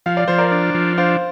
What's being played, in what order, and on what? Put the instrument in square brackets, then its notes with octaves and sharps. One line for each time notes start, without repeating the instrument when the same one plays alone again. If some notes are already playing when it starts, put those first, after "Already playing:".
[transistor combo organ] F3 [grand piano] F5
[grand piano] D5
[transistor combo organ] F3 [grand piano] C5
[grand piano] A#4 D5
[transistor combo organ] D4
F3
[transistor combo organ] D4 [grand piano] C5 F5